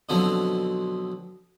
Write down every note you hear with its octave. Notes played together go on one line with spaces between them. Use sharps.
B2 D3 F3 F#3 C4